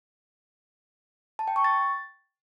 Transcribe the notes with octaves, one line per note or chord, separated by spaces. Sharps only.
A5
G5
C#6
A6